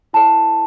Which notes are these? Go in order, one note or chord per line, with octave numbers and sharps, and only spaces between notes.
E4 A4 C#5 A5